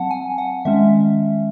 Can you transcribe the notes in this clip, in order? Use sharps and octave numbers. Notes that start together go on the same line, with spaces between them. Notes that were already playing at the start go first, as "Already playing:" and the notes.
Already playing: F#3 C4 F#5 A5
G#5
F#5
D#3 G#3 C#4 E5